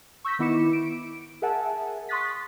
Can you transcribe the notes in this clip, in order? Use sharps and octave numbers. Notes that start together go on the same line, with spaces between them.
C#6 E6 G6 A#6 B6
D#3 B3 E4 D6 C#7 E7
D7
G#4 A#4 E5 F#5 G#5 A5
C6 C#6 D#6 F#6 A6 B6